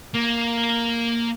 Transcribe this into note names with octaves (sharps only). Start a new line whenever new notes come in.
A#3